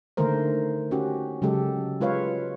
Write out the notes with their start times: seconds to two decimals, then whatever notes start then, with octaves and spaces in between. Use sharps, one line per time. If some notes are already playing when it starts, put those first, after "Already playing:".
0.17 D3 D#3 A3 A#3 A#4 C5
0.91 C#4 F#4 G4
1.42 C#3 F#3 G#3 G4 A4
2.01 G#3 F4 B4 C#5 F5